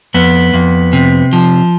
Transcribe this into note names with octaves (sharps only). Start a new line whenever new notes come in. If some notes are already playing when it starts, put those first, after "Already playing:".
F2 B3
F2
C3
F3